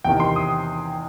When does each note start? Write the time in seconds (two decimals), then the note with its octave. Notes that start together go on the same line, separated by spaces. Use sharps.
0.04 E2 C3 D#3 G5
0.20 C6
0.36 D#6